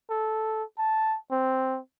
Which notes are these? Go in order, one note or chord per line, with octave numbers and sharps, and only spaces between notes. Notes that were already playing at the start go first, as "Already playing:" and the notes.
A4
A5
C4